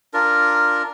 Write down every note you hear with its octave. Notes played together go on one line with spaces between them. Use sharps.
D4 F4 A#4